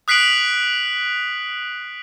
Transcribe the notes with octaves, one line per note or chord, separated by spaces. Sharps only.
D#6 F#6 B6 C7 D7 F#7